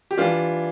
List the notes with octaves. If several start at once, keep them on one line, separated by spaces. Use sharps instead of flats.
G4
E3 G3 D4 F4